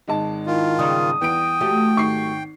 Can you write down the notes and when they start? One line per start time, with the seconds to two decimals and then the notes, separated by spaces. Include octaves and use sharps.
0.08 G#1 G#3 A5
0.47 D#3 E4 F4
0.79 C#3 G3 D#4 D#6
1.21 E2 B3 G5 D7
1.61 F#3 A3 G4
1.96 G#1 C#6 C7